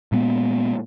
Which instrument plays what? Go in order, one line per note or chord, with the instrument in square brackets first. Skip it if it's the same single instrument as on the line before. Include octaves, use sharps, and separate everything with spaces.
[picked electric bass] A#2 G#3 B3